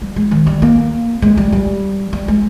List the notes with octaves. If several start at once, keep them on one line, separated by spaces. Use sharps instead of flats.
G3
G#3
D#3
G3
A#3
G#3
G3
G3
G3
G#3